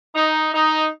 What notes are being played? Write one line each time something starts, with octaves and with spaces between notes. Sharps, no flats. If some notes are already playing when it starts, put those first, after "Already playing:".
D#4
D#4